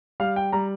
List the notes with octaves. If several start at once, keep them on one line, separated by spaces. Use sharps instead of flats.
G3 F5
G5
G3 A#5